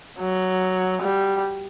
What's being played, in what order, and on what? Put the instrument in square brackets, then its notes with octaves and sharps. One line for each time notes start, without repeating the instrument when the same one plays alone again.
[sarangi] F#3
G3